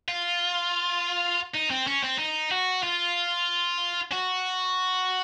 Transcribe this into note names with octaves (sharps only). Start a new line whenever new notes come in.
F4
D#4
C4
C#4
C4
D#4
F#4
F4
F#4